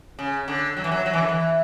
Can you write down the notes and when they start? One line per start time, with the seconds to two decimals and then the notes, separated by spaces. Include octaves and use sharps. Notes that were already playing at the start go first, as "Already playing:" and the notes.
0.19 C#3
0.48 D3
0.77 F#3
0.84 E3
0.92 F#3
1.06 F#3
1.13 E3
1.21 D3
1.28 E3